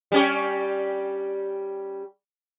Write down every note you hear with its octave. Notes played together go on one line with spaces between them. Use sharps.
G3 C#4 G4